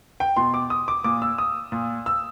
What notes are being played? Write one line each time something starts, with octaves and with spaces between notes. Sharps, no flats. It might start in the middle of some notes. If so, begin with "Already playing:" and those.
G5
B2 C6
D6
D#6
D6
A#2 D6
E6
D#6
A#2
E6